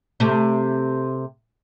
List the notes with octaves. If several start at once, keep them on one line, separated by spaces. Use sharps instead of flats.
C3 A3